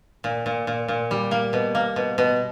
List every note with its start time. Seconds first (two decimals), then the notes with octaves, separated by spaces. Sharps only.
0.24 A#2
0.46 A#2
0.67 A#2
0.88 A#2
1.11 G3
1.31 A#3
1.53 B2
1.75 A#3
1.96 B2
2.18 B2